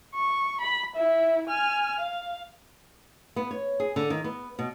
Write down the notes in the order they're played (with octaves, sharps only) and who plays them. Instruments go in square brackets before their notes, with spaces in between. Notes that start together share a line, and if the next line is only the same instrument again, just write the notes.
[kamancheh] C#6
B5
E4 E5
G#5 F6
F5
[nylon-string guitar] B3
C#5
G#4
D3
D#3
B3
B2